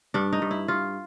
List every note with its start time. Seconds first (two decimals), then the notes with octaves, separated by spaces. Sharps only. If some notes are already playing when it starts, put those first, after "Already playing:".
0.14 G2 D4
0.33 D#4
0.42 G2
0.51 E4
0.68 G2 F4